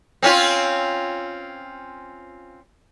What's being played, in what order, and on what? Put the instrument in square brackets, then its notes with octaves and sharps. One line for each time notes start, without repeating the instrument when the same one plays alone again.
[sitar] C4 C#4 F4